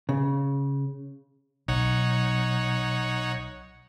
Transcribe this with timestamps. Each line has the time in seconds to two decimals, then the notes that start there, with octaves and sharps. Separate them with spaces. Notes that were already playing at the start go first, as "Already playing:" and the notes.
0.09 C#3
1.68 B1 D#4 C#5 F#5